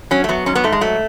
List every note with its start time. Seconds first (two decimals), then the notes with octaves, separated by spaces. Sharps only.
0.11 F#3 C#4
0.24 A3
0.29 F#3 B3
0.46 G#2 C#4
0.55 B3
0.64 G#2 A3
0.73 G#3
0.81 F#3 A3